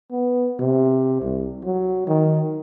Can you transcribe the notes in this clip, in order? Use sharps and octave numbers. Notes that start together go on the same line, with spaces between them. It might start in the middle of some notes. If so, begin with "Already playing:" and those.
B3
C3
C2
F#3
D#3